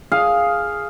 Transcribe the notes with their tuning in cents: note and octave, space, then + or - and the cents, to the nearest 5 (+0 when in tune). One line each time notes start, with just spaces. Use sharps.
G#4 +0 F5 +0